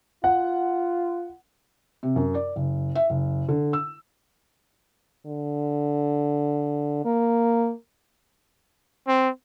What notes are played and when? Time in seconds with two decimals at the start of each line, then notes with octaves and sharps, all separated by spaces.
0.24 F4 F#5
2.03 C3
2.16 F#2
2.34 D5
2.56 F#1
2.95 E5
3.10 F#1
3.49 D3
3.73 E6
5.26 D3
7.05 A#3
9.07 C4